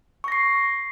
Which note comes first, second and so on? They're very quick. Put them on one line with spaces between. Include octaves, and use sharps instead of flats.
C#6 A#6 C7